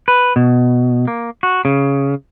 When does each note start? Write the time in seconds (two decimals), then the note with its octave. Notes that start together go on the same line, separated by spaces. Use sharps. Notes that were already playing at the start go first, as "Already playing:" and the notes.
0.08 B4
0.36 B2
1.08 A#3
1.43 F#4
1.65 C#3